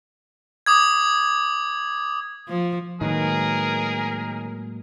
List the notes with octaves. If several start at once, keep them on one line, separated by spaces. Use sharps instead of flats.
D6 D#6 G#6
F3
A2 D#3 F#3 G#3 A#3 G#4 A#4 B4